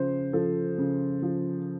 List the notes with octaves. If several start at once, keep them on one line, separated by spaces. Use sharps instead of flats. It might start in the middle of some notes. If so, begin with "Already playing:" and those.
Already playing: C#3 F3 C5
F3 A4
C#3
F3